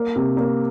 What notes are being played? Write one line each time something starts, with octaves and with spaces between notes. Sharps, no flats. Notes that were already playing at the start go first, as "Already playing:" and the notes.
Already playing: A#3
C3
A#3